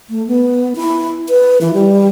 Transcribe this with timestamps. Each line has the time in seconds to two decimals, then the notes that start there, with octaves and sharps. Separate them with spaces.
0.10 A3
0.27 B3
0.76 E4
1.29 B4
1.61 E3
1.73 G3